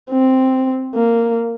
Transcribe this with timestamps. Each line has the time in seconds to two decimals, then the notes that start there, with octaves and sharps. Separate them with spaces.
0.11 C4
0.95 A#3